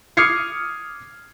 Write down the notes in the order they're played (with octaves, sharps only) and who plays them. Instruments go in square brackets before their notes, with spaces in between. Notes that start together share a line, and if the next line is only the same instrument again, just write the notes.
[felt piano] D6 D#6 F6 G#6 C7 C#7